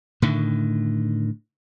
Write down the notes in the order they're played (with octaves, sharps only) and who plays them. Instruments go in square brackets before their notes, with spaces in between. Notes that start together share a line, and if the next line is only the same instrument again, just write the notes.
[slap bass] A2 D3 D#3